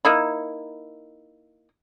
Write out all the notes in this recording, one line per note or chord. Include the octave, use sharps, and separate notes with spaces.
A#3 D#4 E4